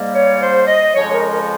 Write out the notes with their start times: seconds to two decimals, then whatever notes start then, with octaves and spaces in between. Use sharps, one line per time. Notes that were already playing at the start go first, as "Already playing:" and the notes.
Already playing: G#2 G3 A#3
0.14 C#5
0.41 C5
0.68 D#5
0.95 F2 C#3 F3 G#3 C#5
1.13 A#4
1.32 A#4